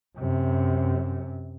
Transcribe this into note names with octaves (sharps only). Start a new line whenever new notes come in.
F#2 C3